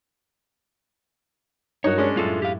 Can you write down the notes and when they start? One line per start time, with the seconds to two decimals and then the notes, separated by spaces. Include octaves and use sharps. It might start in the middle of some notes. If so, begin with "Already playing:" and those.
1.84 G2 F#3 D#4 F#4 A#4 C#5
1.98 G#3 C#4 D4
2.17 F#2 A2 F4 A4
2.42 G4 F5